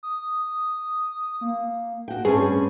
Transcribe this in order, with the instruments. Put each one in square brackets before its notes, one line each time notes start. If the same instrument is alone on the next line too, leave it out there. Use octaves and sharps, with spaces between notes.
[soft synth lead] D#6
A#3
[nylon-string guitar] F#4 G5
[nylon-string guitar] G2 C4 C#4 [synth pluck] G#4 [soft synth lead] C#6